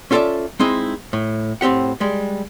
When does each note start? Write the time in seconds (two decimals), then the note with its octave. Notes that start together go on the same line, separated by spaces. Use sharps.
0.11 C#4 F4 A4 C5 D5 E5
0.60 G#3 C4 D#4 E4
1.13 A2
1.61 A2 C4 C#4 G4 F#5
2.00 G3 G#3